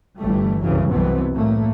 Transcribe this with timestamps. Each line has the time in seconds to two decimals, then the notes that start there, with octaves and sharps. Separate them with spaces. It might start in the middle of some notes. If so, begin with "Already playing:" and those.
0.19 G1 E3 G3 A3
0.62 C2 F#2 C#3 E3 F#3
0.90 C2 F#2 B2 E3 B3 C4
1.33 A2 A3 A#3